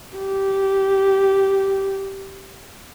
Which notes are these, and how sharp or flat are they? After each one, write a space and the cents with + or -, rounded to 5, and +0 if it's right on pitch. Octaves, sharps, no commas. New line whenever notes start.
G4 -10